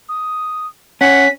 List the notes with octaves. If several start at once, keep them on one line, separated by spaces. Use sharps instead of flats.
D#6
C#4 F#5 B6